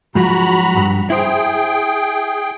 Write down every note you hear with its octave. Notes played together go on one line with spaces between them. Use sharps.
G#2 F3 F#3 F#4 A#5 B5
G2
E4 G#4 C5 G5